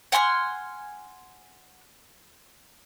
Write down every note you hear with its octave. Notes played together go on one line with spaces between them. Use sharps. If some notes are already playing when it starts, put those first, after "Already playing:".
F#5 G#5 C6 F6